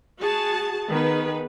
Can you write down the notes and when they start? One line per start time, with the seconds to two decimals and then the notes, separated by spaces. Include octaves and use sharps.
0.20 F#4 G#4 A5
0.88 D#3 B3 G#4 B4